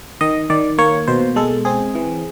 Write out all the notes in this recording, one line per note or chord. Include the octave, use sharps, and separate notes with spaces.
D#3 D#5
D#3 D5
A#3 C#5
B2 C5
G#3 A4
C4 G#4
E3